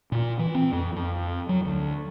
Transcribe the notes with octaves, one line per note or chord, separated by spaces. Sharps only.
A#2
E3
C4
F2
F2
F#3
D2